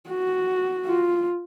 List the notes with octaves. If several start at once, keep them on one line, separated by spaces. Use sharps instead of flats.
F#4
F4